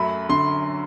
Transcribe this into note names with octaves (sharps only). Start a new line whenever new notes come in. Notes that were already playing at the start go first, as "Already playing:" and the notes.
Already playing: F#2 F#3 A3 B5
D3 C6